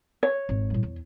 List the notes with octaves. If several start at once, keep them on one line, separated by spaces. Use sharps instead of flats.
C#5
G#1
A2 G3
E2